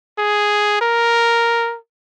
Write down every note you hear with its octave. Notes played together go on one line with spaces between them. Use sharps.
G#4
A#4